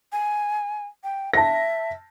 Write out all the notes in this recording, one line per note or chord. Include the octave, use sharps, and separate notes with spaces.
G#5
G5
E5 A5 A#6